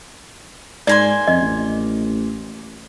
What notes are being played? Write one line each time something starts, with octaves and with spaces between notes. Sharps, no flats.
G#2 A#3 D5 G#5 C6
F2 D#5
A1